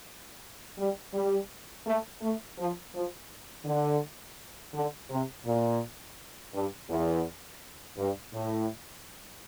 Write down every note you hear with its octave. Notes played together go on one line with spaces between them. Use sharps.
G3
G3
A3
A3
F3
F3
D3
D3
C3
A#2
G2
E2
G2
A2